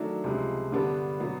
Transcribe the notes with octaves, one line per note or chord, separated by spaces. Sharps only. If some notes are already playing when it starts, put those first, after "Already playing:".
Already playing: D#3 F#3 A3 D4
C#2 C3 F3 G#3
G2 D3 G3 B3 D4
B2 F#3 B3